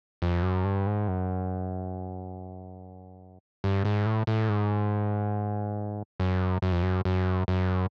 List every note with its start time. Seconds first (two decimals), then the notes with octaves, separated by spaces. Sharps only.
0.22 F2
0.43 F#2
0.64 G2
0.87 G#2
1.08 F#2
3.64 G2
3.85 G#2
4.06 A2
4.27 A2
4.49 G#2
6.20 F#2
6.62 F#2
6.72 F2
6.83 F#2
7.05 F#2
7.48 F#2